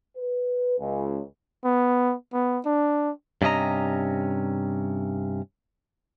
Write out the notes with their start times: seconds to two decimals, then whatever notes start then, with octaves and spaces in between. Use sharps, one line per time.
0.16 B4
0.79 C#2
1.64 B3
2.33 B3
2.65 D4
3.42 G2 C3 C#4 D#5 A#5